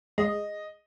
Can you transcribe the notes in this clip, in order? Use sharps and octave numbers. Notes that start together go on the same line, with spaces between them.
G#3 D#5